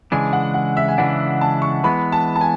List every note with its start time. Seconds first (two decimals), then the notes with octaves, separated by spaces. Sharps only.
0.12 C#3 E3 G#3 D4 G#5
0.33 F#5
0.54 F#5
0.77 E5
0.88 G#5
0.98 C#3 E3 G#3 D4 F#5
1.41 A5
1.62 C#6
1.84 E3 G#3 B3 B5
2.12 A5
2.36 A5
2.41 G#5